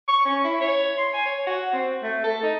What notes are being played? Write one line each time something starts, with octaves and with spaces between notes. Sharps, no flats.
C#6
C#4
E4
C#5
C6
G#5
C#5
F#4
C4
A3
A4
D#4